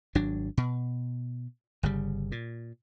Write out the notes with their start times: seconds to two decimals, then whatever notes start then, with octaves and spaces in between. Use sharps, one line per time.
0.15 G#1 F#3 D4
0.57 B2
1.83 G1 C#3 G3
2.32 A#2